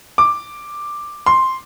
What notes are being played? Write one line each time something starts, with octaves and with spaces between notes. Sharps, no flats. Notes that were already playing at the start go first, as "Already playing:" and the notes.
D6
C6